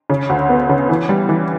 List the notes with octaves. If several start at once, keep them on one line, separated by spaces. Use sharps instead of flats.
C#3
D2
B3
C#3
E3
G3
E3